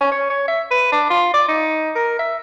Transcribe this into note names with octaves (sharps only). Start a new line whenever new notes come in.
C#4
C#5
C#5
E5
B4
D4
F4
D5
D#4
A#4
E5